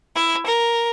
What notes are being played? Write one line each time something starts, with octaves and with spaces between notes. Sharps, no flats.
E4
A#4